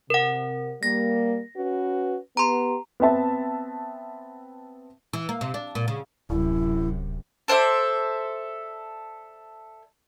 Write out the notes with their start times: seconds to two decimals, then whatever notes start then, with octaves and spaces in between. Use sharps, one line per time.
0.10 C3 A#4 F#5
0.83 G3 A#3 A#6
1.57 C#4 F#4 B4
2.37 B3 G4 A#5 C6
3.00 B3 C4 E5 A5
5.13 E3
5.29 A#3
5.41 C3
5.54 D4
5.75 A#2
5.88 C#3
6.30 D1 F#2 C3 E4
7.48 A4 C5 D5 E5